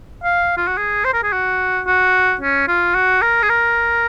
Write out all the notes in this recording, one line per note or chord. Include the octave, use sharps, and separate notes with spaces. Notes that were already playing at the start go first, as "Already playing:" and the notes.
F5
F4
F#4
G#4
C5
A#4
G#4
F#4
F#4
C#4
F4
F#4
A#4
G#4
A#4